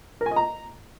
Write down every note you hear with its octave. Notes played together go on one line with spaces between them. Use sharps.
A#4
G#5
D#5
A#5